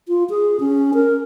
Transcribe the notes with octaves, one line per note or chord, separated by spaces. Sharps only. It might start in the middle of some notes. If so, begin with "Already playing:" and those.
F4
G#4
C#4
A#4